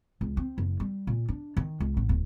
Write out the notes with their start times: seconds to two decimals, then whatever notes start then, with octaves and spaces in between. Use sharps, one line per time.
0.21 C#2
0.37 C4
0.58 F#1
0.80 G3
1.07 A#2
1.28 D4
1.57 D#3
1.80 C#2
1.97 A1
2.09 D1